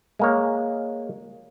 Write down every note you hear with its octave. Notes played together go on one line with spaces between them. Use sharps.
G#3 A#3 C#5